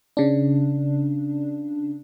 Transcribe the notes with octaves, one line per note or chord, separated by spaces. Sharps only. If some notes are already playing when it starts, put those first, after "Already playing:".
C#3 D4